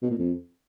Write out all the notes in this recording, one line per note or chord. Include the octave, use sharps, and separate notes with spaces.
B2
A#2
F2